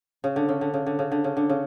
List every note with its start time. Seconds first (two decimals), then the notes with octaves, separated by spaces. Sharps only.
0.24 C#3
0.36 D3
0.49 C#3
0.61 D3
0.74 C#3
0.86 D3
0.99 C#3
1.12 D3
1.24 C#3
1.37 D3
1.49 C#3